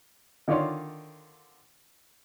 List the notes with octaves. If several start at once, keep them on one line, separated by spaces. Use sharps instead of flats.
D3 D#3 F4 C#5 D5 C6